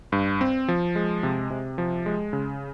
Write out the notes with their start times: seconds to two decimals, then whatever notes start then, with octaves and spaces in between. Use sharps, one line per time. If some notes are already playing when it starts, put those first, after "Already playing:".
0.12 G2
0.41 C4
0.68 F3
0.96 G#3
1.23 C3
1.50 C3
1.78 F3
2.06 G#3
2.33 C#3